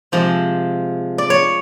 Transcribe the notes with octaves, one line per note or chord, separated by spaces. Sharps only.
C3 F3 G#3 C4
D5
C#5